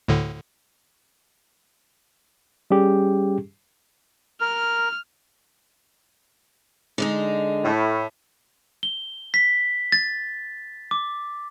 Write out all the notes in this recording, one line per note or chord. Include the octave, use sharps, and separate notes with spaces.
D2 A2 D3
G3 C#4 G4 G#4
A#4 F6
D3 G#3 D#4
A2
G7
B6
A6
D6